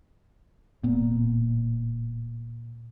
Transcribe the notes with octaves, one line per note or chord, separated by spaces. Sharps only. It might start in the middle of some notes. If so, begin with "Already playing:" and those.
D1 A#2 B3